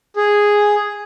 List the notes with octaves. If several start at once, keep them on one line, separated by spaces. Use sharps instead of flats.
G#4